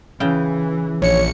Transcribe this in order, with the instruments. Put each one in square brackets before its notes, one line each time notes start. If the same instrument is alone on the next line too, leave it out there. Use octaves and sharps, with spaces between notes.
[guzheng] C#3 G5 [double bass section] E3
[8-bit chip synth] A#1 C#7 [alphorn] C#5